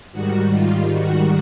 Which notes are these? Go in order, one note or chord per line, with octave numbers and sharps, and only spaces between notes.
G#2 D#3 G3 F#4
F4
F#4